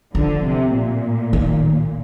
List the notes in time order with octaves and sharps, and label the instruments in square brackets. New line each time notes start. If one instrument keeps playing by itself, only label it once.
[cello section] D3 [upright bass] F3
[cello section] C3
A#2
[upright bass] D#3